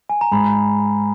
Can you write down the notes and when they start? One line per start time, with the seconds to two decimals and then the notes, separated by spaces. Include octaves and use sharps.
0.09 G#5
0.21 A#5
0.32 G#2 B5